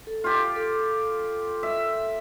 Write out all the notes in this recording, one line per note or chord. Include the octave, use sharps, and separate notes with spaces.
A4
F4 G4
A4
E5